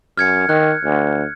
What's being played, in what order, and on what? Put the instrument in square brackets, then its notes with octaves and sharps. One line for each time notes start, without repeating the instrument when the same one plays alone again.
[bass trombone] F#2 [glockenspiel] F6 G#6 C#7
[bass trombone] D#3 [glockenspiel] F#6
[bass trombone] D2